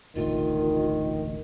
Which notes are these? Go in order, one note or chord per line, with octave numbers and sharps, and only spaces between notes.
E1 A1 D2 D#3 F4